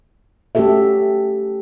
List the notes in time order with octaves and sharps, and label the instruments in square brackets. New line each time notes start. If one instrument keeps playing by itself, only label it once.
[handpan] A3 C#4 F#4 G4 A4 E5